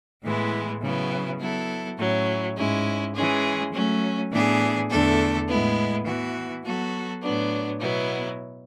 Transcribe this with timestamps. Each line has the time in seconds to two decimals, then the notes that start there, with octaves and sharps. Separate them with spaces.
0.24 A2 E3 G#3 B3 E4
0.82 C#3 F#3 B3 E4
1.40 F#3 B3 E4 A4
1.98 A2 F#3 C#4 E4
2.57 G#2 G#3 C#4 E4
3.15 E3 G#3 C#4 G#4
3.73 F#3 A3 C#4
4.32 A2 E3 B3 D4 G#4
4.90 E2 D3 A3 D4 A4
5.48 A2 G#3 B3 E4
6.06 E3 B3 F#4
6.64 F#3 B3 F#4 A4
7.23 A2 F#3 B3 D4
7.80 B2 F#3 B3 E4